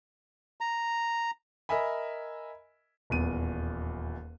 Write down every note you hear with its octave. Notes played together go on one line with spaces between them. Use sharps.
A#5
A#4 D#5 E5 G#5 B5
D#1 E2 D#7